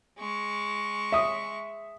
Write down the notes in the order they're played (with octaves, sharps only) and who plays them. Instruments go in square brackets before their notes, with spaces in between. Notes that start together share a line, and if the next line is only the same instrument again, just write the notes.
[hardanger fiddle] G#3 C#6
[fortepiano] E5 D#6